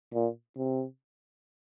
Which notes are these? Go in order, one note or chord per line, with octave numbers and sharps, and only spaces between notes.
A#2
C3